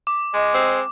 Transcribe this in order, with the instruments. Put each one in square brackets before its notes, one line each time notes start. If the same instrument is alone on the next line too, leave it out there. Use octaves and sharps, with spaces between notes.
[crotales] D6
[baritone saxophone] G#3 [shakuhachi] D#5
[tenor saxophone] C4